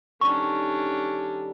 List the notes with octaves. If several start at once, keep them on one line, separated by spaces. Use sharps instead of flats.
D#3 G3 C#4 D4 A4 C#6